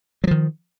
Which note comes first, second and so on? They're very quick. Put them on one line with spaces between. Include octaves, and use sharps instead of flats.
F#3 F3 D#3